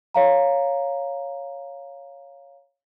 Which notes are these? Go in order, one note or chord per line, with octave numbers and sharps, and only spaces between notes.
C#5 F5 A#5